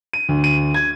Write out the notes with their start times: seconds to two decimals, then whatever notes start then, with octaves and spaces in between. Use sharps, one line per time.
0.13 D#7
0.29 D2
0.44 D#7
0.74 G#6